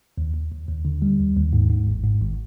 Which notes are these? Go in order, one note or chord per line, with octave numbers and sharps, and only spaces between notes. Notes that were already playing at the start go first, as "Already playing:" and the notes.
D#2
D#2
D#2
D#2
D3
G3
D#2
D#2
G#2
G#2
G#1
G#2
G#1